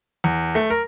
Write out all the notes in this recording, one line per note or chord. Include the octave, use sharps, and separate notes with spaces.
E2
A3
A#4